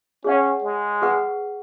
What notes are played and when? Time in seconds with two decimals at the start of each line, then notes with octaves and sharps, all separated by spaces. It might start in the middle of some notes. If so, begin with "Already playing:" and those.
0.24 C#4 G#4 C#5 F#5
0.64 G#3
1.02 G#4 B4 F#5 C#6